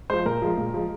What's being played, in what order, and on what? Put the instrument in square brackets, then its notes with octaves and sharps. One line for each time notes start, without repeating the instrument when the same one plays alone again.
[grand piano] F3 G#3 C5
A#2 A#4
F3 G#3
A#2
F3 G#3